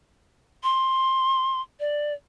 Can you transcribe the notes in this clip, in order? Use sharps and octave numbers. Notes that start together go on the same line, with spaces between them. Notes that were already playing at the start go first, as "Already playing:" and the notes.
C6
D5